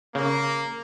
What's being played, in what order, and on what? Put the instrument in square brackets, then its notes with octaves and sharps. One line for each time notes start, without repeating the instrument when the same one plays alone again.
[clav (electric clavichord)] C#3 [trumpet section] A#3